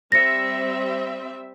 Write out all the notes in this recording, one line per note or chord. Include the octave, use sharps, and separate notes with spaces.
G3 C4 E5 A#6 C#7